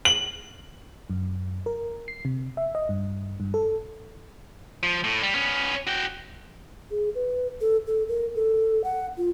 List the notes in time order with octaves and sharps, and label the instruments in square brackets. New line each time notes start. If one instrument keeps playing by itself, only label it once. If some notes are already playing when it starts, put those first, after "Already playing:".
[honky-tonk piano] F#7
[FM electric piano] F#2
A#4
C7
C3
E5
D#5
G2
G2
A4
[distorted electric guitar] F3
A2
G3
B3 C#4
F#4 G5
[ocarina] G#4
B4
A4
A4
A#4
A4
F#5
F4